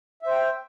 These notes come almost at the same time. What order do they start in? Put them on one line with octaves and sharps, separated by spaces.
E5 C5 G5